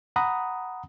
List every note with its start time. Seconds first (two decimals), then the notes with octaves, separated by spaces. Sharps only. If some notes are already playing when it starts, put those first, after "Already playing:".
0.16 F#5 A#5 B5 D#6